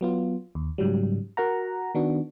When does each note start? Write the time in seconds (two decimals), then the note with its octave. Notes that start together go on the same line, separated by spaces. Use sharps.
0.01 F#3 B3 F4
0.55 D#2
0.78 G#2 C#3 F#3 G3
1.37 F#4 A#4 F#5 A#5
1.95 D#3 B3 D4 F#4